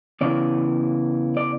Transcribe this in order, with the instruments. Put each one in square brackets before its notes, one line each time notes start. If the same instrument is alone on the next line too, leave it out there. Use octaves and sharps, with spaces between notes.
[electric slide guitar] E2 C#3 E3 D5
D5